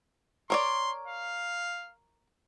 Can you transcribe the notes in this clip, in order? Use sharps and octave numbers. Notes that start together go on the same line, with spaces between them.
A#4 C#5 D5 C6
F5